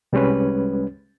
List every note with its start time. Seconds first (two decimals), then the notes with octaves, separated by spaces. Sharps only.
0.13 C2 G3 G#3 C#4 B4